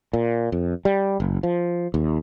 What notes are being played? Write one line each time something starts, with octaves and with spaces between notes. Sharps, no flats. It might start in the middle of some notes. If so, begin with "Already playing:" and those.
A#2
F2
G3
F#1
F3
D#2